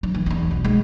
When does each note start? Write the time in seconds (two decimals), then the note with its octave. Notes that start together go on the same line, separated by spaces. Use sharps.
0.03 F3
0.14 E3
0.26 E2 D#4
0.51 B1
0.64 G#3